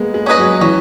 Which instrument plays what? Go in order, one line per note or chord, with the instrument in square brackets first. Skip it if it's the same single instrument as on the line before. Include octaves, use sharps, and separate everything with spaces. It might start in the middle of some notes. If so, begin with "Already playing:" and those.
Already playing: [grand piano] G#3 A#3 B3
G#3
[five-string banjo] C#4 G#4 B4 D#5
[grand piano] F#3
[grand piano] E3 [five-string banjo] C#4